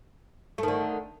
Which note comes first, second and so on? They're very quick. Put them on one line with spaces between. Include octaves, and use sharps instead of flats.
A3 D#3 D3